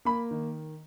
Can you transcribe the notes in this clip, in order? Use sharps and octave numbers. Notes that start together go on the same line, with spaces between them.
A#3 B5
D#3